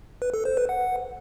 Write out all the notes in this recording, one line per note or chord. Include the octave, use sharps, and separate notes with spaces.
B4
A4
C5
B4
F#5